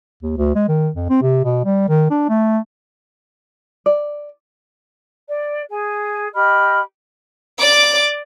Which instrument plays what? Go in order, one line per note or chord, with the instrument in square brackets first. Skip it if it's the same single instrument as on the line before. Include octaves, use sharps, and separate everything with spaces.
[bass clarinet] D#2
D2
G#3
D#3
F2
C4
C3
B2
G3
D#3
D4
A3
[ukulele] D5
[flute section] D5
G#4 G#5
G4 D#5 B5 F6
[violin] D5 D6